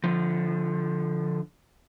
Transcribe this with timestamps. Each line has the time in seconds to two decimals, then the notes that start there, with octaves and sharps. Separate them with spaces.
0.04 D3 F3